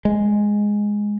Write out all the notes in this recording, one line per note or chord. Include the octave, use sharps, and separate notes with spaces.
G#3